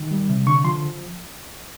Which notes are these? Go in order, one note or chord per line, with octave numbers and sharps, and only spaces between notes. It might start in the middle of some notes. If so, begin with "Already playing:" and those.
Already playing: D#3
G3
C3
D3 C#6
F3 C6